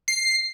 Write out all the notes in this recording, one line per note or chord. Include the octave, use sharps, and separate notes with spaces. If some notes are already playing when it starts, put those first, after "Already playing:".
C7